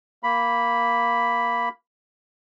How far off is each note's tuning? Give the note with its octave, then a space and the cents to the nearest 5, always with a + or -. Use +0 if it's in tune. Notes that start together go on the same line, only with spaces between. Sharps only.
A#3 +0 B5 +0